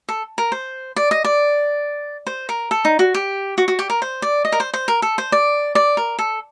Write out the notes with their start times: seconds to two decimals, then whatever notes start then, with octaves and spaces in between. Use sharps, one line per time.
0.09 A4
0.38 A#4
0.52 C5
0.96 D5
1.11 D#5
1.24 D5
2.27 C5
2.49 A#4
2.71 A4
2.85 D#4
2.99 F#4
3.15 G4
3.58 F#4
3.68 F#4
3.79 G4
3.90 A#4
4.02 C5
4.22 D5
4.45 D#5
4.52 A#4
4.60 C5
4.73 C5
4.88 A#4
5.02 A4
5.18 C5
5.32 D5
5.75 D5
5.97 A#4
6.19 A4